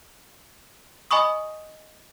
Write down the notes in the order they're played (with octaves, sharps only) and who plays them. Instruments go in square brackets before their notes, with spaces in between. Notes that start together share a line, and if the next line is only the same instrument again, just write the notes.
[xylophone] D#5 G#5 B5 C#6 D#6